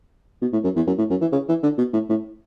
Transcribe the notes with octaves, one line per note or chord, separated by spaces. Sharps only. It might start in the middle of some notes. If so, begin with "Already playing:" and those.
B2
A2
F#2
E2
F#2
A2
F#2
E3
C#3
E3
D3
B2
A2
A2